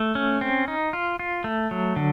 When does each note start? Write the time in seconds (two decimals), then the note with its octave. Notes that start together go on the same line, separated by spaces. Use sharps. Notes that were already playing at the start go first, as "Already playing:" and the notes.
Already playing: A3
0.15 C#4
0.41 C4
0.68 D#4
0.93 F4
1.19 F4
1.44 A3
1.71 F#3
1.96 D3